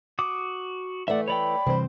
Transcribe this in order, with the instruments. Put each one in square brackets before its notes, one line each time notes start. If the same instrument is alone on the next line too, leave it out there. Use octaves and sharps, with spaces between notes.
[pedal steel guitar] F#4 D6 D#6
[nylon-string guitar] E3 A3 [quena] D5 [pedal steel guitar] E5 F#5
[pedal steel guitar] C#5 D5 G5 [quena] B5
[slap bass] C3 E3 G3 [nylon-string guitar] C4 C5